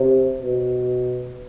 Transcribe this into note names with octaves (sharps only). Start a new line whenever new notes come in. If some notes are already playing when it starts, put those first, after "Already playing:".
Already playing: C3
B2